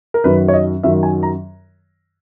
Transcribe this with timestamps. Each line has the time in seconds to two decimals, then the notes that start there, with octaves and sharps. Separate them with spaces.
0.14 A#4
0.24 F#2 D#3 F#3 B4
0.48 C#5
0.53 D#5
0.83 F#2 D#3 F#3 E5
1.03 G#5
1.23 A#5